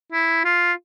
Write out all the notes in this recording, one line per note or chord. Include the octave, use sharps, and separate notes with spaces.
E4
F4